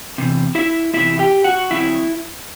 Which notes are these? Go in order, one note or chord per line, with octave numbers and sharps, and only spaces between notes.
E2 C3
E4 E5
E2 C3 E3 B3 E4 E5
G4 G5
F#4 F#5
D3 F#3 C4 E4 E5